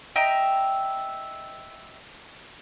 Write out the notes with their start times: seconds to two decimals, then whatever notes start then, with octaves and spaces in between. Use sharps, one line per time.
0.16 D#5 E5 G5 A#5